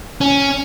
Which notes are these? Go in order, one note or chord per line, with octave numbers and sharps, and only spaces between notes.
C#4